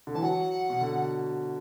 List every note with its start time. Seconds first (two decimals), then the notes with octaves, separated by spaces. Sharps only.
0.07 D3
0.14 E3 A5
0.23 F#3 F#5
0.70 B2
0.81 D3